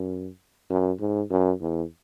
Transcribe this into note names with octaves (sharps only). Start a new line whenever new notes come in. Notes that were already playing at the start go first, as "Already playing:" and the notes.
Already playing: F#2
F#2
G#2
F#2
E2